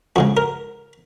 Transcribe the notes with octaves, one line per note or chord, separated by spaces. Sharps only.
F2 C#3 G#3 F#4
A#4